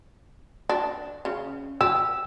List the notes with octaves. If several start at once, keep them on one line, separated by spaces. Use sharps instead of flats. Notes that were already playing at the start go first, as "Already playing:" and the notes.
D4
C#3
G4 E6